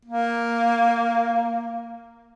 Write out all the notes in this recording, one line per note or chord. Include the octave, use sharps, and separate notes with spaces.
A#3